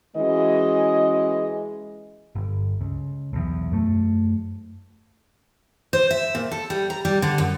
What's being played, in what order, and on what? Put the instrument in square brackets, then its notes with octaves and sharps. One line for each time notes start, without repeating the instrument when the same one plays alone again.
[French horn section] E3 G#3 C#4 F#4 G#4 D#5
[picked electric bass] G1
C#2
B1 E2
F#2 A3
[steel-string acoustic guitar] C5
E5
A#2
A4
G3
A#5
G3
D3
F#2